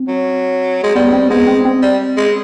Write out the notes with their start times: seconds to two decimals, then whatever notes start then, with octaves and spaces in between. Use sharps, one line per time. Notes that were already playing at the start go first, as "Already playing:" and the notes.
Already playing: C4
0.08 F#3
0.83 G#3
0.95 G3 B3
1.13 C4
1.30 G#3 B3
1.47 C4
1.65 C4
1.82 G3
2.17 G#3